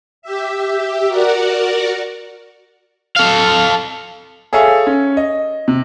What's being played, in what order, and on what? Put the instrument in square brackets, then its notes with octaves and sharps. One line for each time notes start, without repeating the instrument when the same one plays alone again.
[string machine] G4 E5
F#4 A#4 D5 F#5
[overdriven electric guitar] A4 F5
[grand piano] G#4 A4 C#5 E5 F5 G#5
C#4
D#5
C3